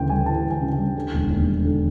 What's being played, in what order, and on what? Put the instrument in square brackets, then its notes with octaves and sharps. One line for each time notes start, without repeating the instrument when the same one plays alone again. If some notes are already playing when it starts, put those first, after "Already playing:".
Already playing: [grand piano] D2 C#3 E3 G5
G3 G#5
E3 A5
D2
G#5
C#3
G5
G3
D3
E1
D#2
G3
D3